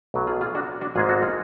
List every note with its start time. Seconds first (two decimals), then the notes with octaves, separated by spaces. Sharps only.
0.14 B1 B2 F#3
0.27 F4 G#4
0.41 F4 G#4
0.55 D4 F#4
0.81 D4 F#4
0.95 G#1 G#2 G#3 F4 G#4
1.09 F#4 A4
1.22 F4 G#4